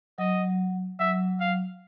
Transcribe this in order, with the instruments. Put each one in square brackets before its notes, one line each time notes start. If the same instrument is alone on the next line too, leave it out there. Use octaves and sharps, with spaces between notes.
[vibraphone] F#3 [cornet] D#5
[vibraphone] F#3 [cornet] E5
[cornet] F5